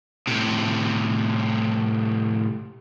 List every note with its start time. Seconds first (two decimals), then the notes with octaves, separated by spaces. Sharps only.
0.27 A2 C3